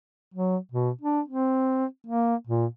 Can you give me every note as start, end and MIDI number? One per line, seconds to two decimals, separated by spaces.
0.34 0.57 54
0.72 0.90 47
1.01 1.21 62
1.28 1.85 60
2.07 2.36 58
2.47 2.66 46